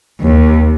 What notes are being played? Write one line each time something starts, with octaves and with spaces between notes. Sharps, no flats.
D#2